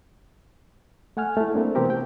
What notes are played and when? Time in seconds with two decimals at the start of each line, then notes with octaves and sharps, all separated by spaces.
1.17 A3 F#5 G#5 F6
1.37 A3 E4
1.54 A3 A#3 C4 D4
1.75 C3 E3 B3 C4 G4 A#4
1.90 G5